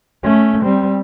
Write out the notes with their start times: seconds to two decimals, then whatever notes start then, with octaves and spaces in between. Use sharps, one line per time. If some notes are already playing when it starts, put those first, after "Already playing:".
0.23 A3 C#4
0.63 G3 C4